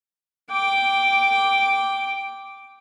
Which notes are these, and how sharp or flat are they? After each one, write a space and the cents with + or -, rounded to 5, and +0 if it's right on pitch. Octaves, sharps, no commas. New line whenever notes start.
G5 +0 D6 -5